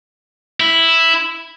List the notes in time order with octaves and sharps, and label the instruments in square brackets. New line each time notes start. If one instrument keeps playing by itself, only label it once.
[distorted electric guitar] E4